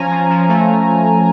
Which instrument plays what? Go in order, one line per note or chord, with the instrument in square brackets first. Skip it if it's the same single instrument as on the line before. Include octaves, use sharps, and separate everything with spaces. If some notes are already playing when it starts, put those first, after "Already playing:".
Already playing: [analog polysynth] F3 C#4 G#5 A#5
F3
F3
A3